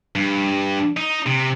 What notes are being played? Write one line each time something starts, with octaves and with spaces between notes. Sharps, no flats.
G2
D#4
C3